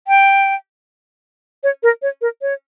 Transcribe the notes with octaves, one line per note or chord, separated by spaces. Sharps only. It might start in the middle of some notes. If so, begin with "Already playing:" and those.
G5
C#5
A#4
C#5
A#4
C#5